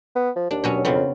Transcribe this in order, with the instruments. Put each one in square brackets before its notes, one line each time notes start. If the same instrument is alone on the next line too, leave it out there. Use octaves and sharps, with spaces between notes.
[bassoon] B3
F3
[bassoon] D#2 [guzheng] D4
[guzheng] B2 F#3 C#4
[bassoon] F2 [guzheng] C#3 B3 C4